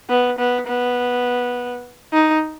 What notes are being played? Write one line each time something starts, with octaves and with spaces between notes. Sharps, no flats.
B3
B3
B3
D#4